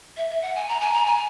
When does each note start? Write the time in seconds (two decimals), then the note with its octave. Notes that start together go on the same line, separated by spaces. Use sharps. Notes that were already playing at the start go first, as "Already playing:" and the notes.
0.17 E5
0.30 E5
0.42 F#5
0.55 G#5
0.68 A#5
0.80 G#5
0.93 A#5
1.06 G#5